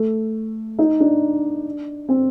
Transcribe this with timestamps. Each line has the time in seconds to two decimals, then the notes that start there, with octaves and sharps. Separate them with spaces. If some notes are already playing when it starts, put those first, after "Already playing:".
Already playing: A3
0.79 D#4
1.00 D4
2.09 C4